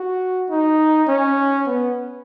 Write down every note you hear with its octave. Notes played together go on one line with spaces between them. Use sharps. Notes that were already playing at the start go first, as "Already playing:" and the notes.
Already playing: F#4
D#4
C#4
B3